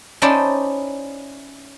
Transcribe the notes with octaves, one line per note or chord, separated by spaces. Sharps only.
C#4 D#4 E4 C5 D5 A5